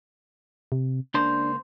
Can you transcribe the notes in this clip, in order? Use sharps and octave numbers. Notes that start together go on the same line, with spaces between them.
C3
C#2 A#3 D4 C5